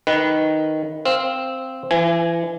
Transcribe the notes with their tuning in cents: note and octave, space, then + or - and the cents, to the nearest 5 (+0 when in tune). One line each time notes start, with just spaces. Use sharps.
D#3 +0 B4 +0
C4 +0 F5 -10
E3 +35 G#5 +0